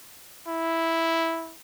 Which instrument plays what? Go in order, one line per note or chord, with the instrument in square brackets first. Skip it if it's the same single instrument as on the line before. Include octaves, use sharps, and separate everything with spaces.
[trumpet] E4